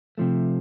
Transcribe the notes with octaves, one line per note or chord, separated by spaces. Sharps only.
C3 F3 A3